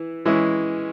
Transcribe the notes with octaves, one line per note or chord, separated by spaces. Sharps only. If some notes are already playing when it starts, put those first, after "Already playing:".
Already playing: E3 E4
E3 G#3 C#4 E4